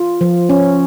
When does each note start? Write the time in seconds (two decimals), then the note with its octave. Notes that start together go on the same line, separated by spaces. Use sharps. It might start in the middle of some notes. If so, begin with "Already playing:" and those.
Already playing: F4
0.21 F3
0.49 C#4